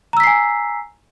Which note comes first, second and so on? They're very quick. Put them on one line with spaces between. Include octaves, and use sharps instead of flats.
A#5 E6 B6 C7 G#5